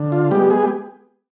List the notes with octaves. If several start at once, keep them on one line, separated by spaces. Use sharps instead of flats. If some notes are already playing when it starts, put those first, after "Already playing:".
Already playing: D3
F4
G3 G#3 B3 G4
G#3 G#4
G4